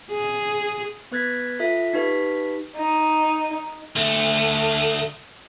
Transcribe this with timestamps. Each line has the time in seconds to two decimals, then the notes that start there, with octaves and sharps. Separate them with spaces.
0.11 G#4
1.12 B3 B4 F#6 G#6 A6 B6
1.59 F4 A4 E5 F5 B6
1.93 D#4 G4 B4 F5 B6
2.76 D#4
3.96 D2 A3